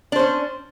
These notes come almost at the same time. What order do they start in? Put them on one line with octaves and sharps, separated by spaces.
D4 C5 C#4